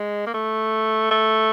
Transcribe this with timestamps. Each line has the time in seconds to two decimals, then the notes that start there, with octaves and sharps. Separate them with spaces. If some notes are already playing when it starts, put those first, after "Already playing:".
Already playing: G#3
0.27 A#3
0.34 A3
1.11 A3